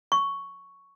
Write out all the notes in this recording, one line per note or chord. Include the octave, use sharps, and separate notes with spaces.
C#6